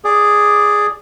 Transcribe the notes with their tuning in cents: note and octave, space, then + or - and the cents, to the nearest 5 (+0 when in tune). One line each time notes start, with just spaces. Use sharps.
G#4 +0 D5 +0 D6 +0